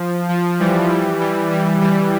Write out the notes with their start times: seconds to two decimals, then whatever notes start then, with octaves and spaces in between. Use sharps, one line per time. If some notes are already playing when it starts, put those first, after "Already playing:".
Already playing: F3
0.29 F3
0.60 E3 G3
0.89 E3 G3
1.20 E3 G3
1.50 E3 G3
1.81 E3 G3